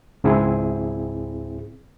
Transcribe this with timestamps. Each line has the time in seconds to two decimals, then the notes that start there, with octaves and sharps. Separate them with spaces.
0.24 C#2 G#2 C4 E4 G#4